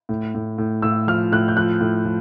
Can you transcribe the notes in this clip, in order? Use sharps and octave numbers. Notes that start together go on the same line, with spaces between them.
A2
A2
A2
A2 E6
F3 F6
A2 F#6
G6
F3 F#6
A2
F3